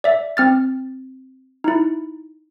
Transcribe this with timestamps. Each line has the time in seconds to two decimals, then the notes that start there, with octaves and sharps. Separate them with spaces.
0.04 D5 E5
0.37 C4 F6 A6
1.64 D#4 E4